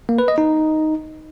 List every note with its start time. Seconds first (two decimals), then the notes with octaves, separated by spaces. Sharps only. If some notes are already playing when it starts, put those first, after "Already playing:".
0.09 A#3
0.19 B4
0.28 D#5
0.38 D#4